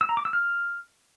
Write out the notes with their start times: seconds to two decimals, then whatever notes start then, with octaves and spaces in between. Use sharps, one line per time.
0.01 E6
0.09 A#5
0.17 D6
0.25 E6
0.33 F6